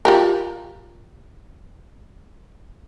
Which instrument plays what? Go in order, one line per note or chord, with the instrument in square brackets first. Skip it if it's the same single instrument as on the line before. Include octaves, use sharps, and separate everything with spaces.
[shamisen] F4 G4 A#4